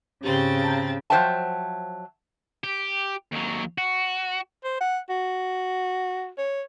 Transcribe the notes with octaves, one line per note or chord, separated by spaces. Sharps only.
G#2 C#3 C4 G4 A6
A5 A#5 G6
F3 F#3 C5 E5 G5 A5
G4
D#2 F#3
F#4
C5
F#5
F#4
C#5